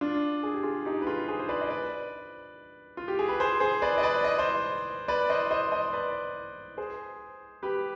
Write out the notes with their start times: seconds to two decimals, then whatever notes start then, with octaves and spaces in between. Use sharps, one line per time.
0.01 D4 F4
0.43 G#4
0.54 G4
0.63 F4 G#4
0.85 D#4 G4
1.02 B4
1.07 F4 G#4
1.28 G#4 C5
1.39 C5
1.49 B4 D5
1.61 D#5
1.70 B4 D5
2.97 F4
3.08 G4
3.19 G#4
3.28 B4
3.40 G#4 C5
3.60 G#4 C5
3.82 B4 D5
3.98 D#5
4.03 B4 D5
4.24 D#5
4.38 C5 D#5
5.08 B4 D5
5.30 C5 D#5
5.51 C5 D#5
5.72 C5 D#5
5.93 B4 D5
6.78 G#4 C5
7.63 G4 B4